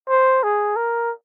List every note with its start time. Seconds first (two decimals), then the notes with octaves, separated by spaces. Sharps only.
0.09 C5
0.43 G#4
0.76 A#4